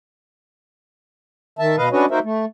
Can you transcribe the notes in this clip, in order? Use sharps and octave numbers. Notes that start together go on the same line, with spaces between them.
D#3 E5 A5
B2 B4 D#5 F5
C#4 D4 F#4 B4 C#5 D#5
A#3 D#4 F#4 A#4 C5 E5
A3